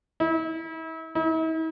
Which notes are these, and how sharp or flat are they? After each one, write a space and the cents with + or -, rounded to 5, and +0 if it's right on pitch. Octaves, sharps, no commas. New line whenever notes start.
E4 -35
E4 -45